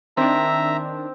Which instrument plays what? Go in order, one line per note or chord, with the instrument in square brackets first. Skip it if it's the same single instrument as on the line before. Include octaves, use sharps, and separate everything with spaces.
[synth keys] D#3 D4 [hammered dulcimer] C4 [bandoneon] E5 A#5